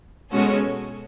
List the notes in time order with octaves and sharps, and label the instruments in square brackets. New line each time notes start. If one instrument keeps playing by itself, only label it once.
[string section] B2 G#3 C#4 F#4 A4